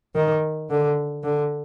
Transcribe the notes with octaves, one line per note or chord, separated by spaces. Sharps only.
D#3
D3
D3